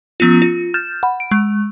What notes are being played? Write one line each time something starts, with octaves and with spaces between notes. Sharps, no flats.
F3 B3 C#4 F4
F4
F6 G6 A6 E7
F#5 B5
D7
G#3